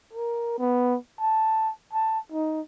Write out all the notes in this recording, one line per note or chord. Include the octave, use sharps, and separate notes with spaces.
A#4
B3
A5
A5
D#4